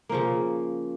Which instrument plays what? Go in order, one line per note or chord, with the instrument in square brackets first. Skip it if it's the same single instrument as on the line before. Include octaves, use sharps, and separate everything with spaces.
[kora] C#3 F3 A#3